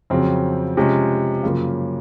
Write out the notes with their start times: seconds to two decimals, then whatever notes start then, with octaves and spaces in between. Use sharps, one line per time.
0.10 F2 C#3 F#3 C4
0.77 C3 F3 G#3 C#4
1.43 F#2 C#3 F3 A#3 F4